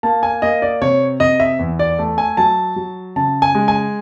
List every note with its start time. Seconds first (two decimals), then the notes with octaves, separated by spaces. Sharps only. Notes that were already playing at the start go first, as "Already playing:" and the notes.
0.03 A#3 A5
0.23 G#5
0.42 A#3 D#5
0.62 D5
0.81 C3 C#5
1.20 C3 D#5
1.40 E5
1.59 E2
1.79 D5
1.99 A3
2.18 G#5
2.37 F#3 A5
2.76 F#3
3.16 C#3 A5
3.42 G#5
3.55 G#3
3.68 G#5